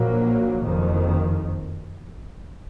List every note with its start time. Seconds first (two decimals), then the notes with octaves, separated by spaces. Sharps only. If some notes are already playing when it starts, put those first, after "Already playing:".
Already playing: A#1 A#2 F#3 A#3
0.63 F#1 F2 D#3